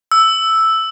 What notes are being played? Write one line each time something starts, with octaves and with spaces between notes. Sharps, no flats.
E6